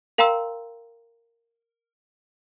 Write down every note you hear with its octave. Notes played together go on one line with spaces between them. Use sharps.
A#4 F5 G5 A#5 C6 E6